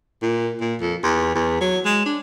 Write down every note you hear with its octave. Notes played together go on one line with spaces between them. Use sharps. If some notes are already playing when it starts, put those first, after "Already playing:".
A#2
A#2
F2
E2
E2
F#3
G#3
D4